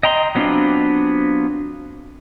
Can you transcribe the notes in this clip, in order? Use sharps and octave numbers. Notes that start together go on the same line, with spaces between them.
D#5 G5 A#5 C6
F#3 B3 C4 D4 F4